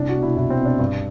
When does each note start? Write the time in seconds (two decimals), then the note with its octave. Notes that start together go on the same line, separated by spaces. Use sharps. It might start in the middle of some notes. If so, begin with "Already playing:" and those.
Already playing: C2 D4
0.09 F#4
0.16 B2
0.23 E4
0.36 C2 E4
0.50 C4
0.57 B2
0.65 D4
0.79 G2